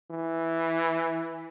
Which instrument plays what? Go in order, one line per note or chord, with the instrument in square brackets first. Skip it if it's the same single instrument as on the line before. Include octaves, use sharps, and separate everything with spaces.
[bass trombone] E3